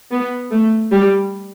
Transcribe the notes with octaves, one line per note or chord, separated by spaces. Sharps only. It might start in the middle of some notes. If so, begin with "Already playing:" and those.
B3
A3
G3